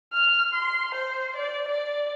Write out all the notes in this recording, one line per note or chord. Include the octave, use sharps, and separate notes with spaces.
F6
C6
C5
D5
D5